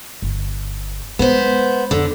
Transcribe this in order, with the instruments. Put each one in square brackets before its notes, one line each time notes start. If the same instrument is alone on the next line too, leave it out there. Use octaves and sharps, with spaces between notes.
[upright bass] G1
[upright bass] G#3 [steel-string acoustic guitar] B3 C5
[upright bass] F2 [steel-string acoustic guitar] D3